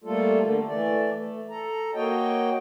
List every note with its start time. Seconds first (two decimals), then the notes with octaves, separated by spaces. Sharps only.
0.04 G3 A3 A#3 F4 A4
0.41 D3 A3 A#3
0.68 E3 A3 D5
1.14 A3
1.50 A4 A#5
1.95 A#3 F#4 C#5 D#5 G5